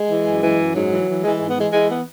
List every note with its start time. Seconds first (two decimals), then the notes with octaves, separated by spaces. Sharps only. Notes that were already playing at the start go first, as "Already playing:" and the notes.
Already playing: G#3
0.09 E3
0.26 F#2
0.42 E3
0.58 F#2
0.75 G#2 F#3
0.91 E3
1.08 E3
1.23 E3 G#3
1.36 G#2 G#3
1.49 B3
1.57 E3 G#3
1.73 E3 G#3
1.90 B3